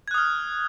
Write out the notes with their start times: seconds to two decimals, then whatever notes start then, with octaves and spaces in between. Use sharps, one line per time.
0.08 G#6
0.11 F#6
0.14 D#6
0.18 F6